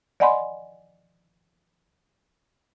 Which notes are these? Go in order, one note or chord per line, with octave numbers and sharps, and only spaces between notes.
D5 D#5 F#5 G#5 B5 C6